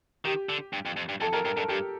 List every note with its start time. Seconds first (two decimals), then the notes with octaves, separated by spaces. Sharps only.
0.25 D#3 G4
0.49 D3
0.73 G2
0.86 F2
0.97 F2
1.09 G2
1.21 F2 A4
1.33 F2 A#4
1.45 G2 A#4
1.57 G2 A4
1.68 G2 G4